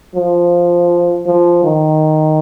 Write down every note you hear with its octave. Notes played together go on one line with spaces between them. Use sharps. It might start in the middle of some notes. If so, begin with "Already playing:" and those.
F3
F3
D#3